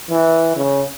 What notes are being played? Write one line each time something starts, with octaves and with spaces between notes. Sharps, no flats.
E3
C#3